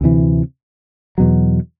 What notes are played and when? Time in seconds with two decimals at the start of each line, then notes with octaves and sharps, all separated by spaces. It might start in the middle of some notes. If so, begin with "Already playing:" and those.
0.01 D2 C3 E3
1.18 E2 B2 F#3